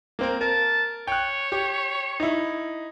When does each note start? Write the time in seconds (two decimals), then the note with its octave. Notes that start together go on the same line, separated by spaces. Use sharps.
0.19 A#3 C4 A#4
0.41 A#4 A5
1.07 C#5 G5 F#6
1.52 G4
2.20 D#4 E4